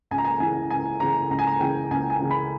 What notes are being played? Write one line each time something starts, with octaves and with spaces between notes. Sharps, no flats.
C#2 G#5
A#5
G#5
C#3 E3 G#5
C#2 G#5
C#3 E3 A#5
C#2 A#5
G#5
A#5
C#3 E3 G5
C#2 G#5
G#5
C#3 E3
B5